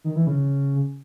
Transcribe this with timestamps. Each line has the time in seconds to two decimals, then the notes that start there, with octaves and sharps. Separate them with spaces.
0.04 D#3
0.16 E3
0.27 C#3